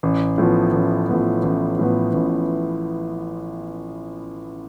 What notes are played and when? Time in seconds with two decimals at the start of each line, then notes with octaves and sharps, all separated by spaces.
0.03 A1
0.38 A2 F3 B3
0.73 A1
1.09 A2 F3 B3
1.43 A1
1.79 A2 F3 B3
2.14 A1